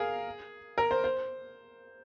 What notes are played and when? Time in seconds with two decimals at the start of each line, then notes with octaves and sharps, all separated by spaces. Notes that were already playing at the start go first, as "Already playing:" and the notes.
Already playing: G#4 A#4 F5
0.78 A#4
0.91 C5
1.04 C5